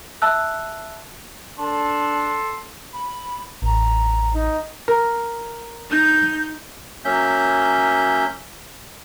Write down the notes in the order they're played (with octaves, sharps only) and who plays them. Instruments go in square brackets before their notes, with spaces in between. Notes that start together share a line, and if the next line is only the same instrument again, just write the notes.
[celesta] E5 A5 E6 F#6
[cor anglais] D4 [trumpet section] A4 C6
[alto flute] B5
[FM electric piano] A1 [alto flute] A#5
[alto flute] D#4
[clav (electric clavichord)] A#4
[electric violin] D#4 G6
[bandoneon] F#3 A#3 C#4 E5 G6